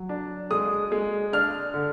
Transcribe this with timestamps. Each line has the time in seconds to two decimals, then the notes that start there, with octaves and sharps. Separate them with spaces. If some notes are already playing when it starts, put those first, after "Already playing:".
Already playing: F#3
0.09 D4
0.51 G#3 D#6
0.92 G#3
1.33 D4 F6
1.74 D3